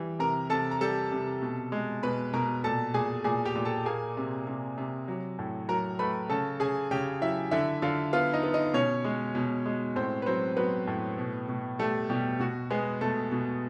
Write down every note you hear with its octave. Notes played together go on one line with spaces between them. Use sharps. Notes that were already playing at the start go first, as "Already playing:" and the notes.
Already playing: E3 G3
C3 A#4 A#5
C3 A4 A5
A#5
G3 A4 A5
C3
B2
G#3
B2 B4 B5
B2 A#4 A#5
A#2 A4 A5
A#2 G#4 G#5
A#2 G#4 G#5
G4 G5
A#2
A4 A5
A#3 G#4 G#5
C3
C3
C3
F#3
A2
F#3 A#4 A#5
A3 B4 B5
C#3 A4 A5
C#3 G#4 G#5
C#3 G4 G5
F#3 E4 E5
D3 E4 E5
D3 F4 F5
B3 F4 F5
D#4 D#5
B3
D#4 D#5
B2 C#4 C#5
G#3
B2
G#3
A2 C4 C5
B4
F#3 C4 C5
F#3 B3 B4
A2
B2
B2
G3 A3 A4
B2 G3 G4
B2 F#4
G#3 B3 G#4
B2 A3 A4
B2